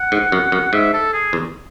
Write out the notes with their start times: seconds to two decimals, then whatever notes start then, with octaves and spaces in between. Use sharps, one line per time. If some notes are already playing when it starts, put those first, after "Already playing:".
Already playing: F#5
0.12 G#2
0.32 F#2
0.52 F#2
0.73 G#2 E5
0.93 A4
1.13 G#4
1.33 E2